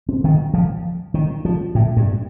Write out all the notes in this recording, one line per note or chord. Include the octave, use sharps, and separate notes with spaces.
C4
D#3
F3
D#3
F3
A2
G2